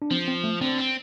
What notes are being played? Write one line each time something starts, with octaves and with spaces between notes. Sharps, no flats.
D4
F3 C4
C4
A3
D3 C4
C4